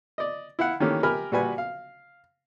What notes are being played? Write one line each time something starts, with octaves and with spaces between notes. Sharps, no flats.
D5 D#5
E4 F5 F#5
D#3 E3 A3 A#3 C#4 G4
G4 A#4 G#5 B5 F6
A#2 G3 F#4 B4 G#5
F5